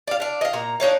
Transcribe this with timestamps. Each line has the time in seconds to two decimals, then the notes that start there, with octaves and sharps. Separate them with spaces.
0.07 D5 F5
0.20 D4 F5
0.41 D#5 F5
0.53 A#2 A#5
0.80 D4 D#4 C#5 F5